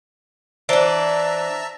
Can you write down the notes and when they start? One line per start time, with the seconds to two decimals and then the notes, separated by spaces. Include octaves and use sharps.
0.69 E3 D4 C5 D5 E5 A5 A#5